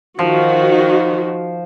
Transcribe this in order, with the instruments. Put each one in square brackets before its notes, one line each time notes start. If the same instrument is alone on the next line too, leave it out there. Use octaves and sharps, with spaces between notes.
[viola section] D#3 F#4 [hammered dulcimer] F3